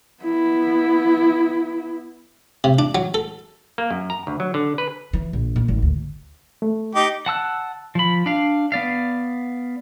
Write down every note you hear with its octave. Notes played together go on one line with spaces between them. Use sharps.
B3 E4
C3
D4
F#3
A4
A#3
F#2
A#5
D2
F#3
D3
B4
E3
A#1
A#2
G#1
D2
A3
D#4 G4
F#5 A5 E6 F#6
F3 B5
D4 F5
B3 D5 F5